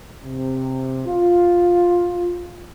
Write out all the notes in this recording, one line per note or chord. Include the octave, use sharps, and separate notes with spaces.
C3
F4